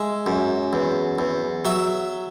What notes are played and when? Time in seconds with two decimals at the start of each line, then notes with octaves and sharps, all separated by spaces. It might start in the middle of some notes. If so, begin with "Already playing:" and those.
Already playing: G#3 E5
0.26 F#2
0.73 E2
1.19 E2
1.65 F#3 E5